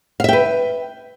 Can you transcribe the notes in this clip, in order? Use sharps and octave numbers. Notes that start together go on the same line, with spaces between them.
B4 E5 F5 G5